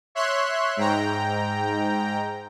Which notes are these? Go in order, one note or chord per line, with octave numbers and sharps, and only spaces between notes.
C#5 E5 C6 F#6
G#2 G5 A#5